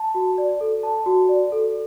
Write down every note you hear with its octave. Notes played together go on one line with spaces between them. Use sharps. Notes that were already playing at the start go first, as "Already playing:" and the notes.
Already playing: A5
F#4
D5
A4
A5
F#4
D5
A4